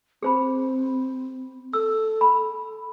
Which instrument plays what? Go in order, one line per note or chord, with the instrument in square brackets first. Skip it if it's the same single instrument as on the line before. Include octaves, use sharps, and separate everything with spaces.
[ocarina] C4 [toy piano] G#4 C5 B5
[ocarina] A4 [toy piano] E6
[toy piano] B5